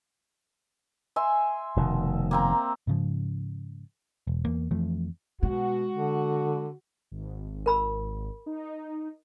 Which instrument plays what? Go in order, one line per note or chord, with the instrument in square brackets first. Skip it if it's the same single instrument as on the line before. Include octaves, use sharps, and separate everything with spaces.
[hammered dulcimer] E5 G#5 C6
[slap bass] F1 B2 D#3
[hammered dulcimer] A#3 C4 A#5
[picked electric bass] G#2 C#3 F3
E1
E2 A#3
F2 E3 F3 A3
[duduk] B2 [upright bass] G#3 [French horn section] F#4
[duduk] D3
[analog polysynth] G#1
[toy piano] A#4 B5 E6
[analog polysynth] D#4